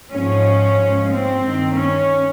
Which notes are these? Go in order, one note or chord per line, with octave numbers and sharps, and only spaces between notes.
G#2 F3 C#4
G#2 F3
C4
G2 D#3
C#4